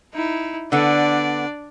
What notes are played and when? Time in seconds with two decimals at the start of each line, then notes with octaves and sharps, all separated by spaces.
0.14 D#4 E4
0.72 D3 B3 D4 D5